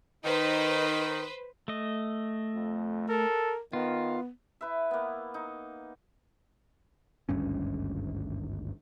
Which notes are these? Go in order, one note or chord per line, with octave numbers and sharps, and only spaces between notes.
D#3 D#4 B4 C5
A3 D#5
F2
A4 A#4
D#3 B3 F4
E4 B4 E5
A#3 B3
D#4
G#1 D2 G2 C#4